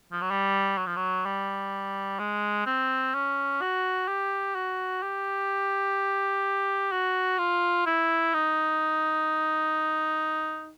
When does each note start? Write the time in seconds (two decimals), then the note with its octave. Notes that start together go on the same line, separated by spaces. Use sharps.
0.12 F3
0.21 F#3
0.31 G3
0.78 F#3
0.86 F3
0.96 F#3
1.26 G3
2.19 G#3
2.66 C4
3.14 C#4
3.61 F#4
4.08 G4
4.55 F#4
5.03 G4
6.92 F#4
7.38 F4
7.86 E4
8.34 D#4